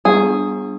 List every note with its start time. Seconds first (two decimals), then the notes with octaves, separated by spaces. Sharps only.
0.05 G3 B3 D4 G#4